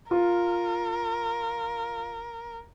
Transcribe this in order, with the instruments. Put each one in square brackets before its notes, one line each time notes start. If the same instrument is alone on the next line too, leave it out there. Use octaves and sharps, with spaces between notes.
[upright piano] F4 [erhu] A#4